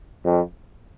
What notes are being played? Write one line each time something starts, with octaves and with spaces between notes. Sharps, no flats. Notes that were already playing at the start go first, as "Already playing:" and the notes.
F2